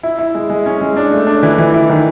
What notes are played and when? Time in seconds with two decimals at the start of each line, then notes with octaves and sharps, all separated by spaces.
0.03 E4
0.19 E4
0.35 G#3
0.50 G#3
0.66 C#4
0.81 G#3
0.97 D4
1.12 A3
1.27 D4
1.43 E3
1.58 E3
1.74 E3
1.90 D#3